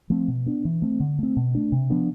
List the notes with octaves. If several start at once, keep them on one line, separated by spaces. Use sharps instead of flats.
F3 A3 C4
B2
B3 D4
E3
A3 C4
D3
A3 C4
B2
A3 D4
C3
F3 B3 D4